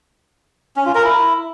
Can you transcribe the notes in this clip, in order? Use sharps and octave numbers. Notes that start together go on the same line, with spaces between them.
C#4
F4
A#4
E4